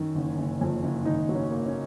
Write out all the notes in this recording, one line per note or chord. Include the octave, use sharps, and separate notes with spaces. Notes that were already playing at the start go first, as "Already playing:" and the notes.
Already playing: F#2 D#3 C#4
F#1
F#1
F2
F#1
G#1 D#4
F#3
C#4
A#3
C#4